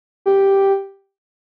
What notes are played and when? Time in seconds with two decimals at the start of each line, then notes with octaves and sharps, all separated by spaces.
0.26 G4